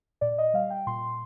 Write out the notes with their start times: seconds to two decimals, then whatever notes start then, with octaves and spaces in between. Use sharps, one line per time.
0.21 A#2 D5
0.38 D#5
0.54 G3 F5
0.70 G5
0.87 A#2 C6